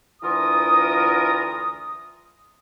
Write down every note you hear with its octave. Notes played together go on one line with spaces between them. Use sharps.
D2 E3 F4 A#4 D#6